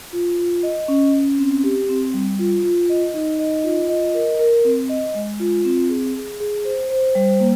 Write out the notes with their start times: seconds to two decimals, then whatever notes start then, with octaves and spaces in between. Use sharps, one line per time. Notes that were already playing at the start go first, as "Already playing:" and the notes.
0.13 F4
0.39 F4
0.63 D#5
0.88 C#4
1.14 C#4
1.39 C4
1.64 G4
1.89 C4
2.14 G3
2.39 F4
2.64 F4
2.89 D#5
3.14 D#4
3.39 D#5
3.64 F4
3.89 D#5
4.14 A#4
4.39 A#4
4.64 C4
4.89 D#5
5.15 G#3
5.40 F4
5.65 C4
5.90 G#4
6.15 G#4
6.40 G#4
6.65 C5
6.90 C5
7.15 G3
7.40 A#3